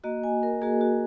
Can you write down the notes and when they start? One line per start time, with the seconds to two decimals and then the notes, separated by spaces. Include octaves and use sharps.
0.04 A#3 F#4 D#5
0.24 G#5
0.43 A#4
0.62 A#3 F#4 G#4
0.81 F#4